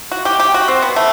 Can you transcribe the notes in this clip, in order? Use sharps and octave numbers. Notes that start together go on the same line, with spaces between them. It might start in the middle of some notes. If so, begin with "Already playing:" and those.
F#4
G4
G4
F#4
C4
B3
A3